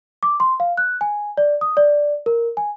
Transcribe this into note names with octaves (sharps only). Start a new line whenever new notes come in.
D6
C6
F5
F#6
G#5
D5
D#6
D5
A#4
G#5